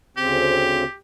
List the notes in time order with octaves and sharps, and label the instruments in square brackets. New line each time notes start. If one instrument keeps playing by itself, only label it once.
[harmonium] D2 C#3 C4 [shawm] G4